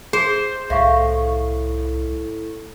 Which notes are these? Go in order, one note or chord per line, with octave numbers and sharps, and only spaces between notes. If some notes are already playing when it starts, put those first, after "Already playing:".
G#4 C5
C2 A2 E5 F5 C#6